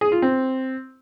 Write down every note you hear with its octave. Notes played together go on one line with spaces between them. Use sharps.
G#4
F4
C4